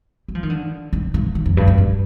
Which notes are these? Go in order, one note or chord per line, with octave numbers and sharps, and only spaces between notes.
G3
F3
D#3
D3
D#3
D#3
D#3
F2
G2
G2
G2